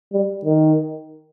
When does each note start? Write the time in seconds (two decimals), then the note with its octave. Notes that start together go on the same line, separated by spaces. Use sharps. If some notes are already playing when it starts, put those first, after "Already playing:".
0.13 G3
0.45 D#3